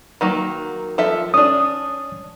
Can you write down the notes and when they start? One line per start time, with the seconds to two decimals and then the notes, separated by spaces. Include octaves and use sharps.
0.21 D#3 F#3 A#3
0.98 F3 A4 E5
1.34 C#4 D4 D#6